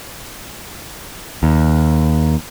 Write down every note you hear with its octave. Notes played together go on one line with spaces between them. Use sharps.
D#2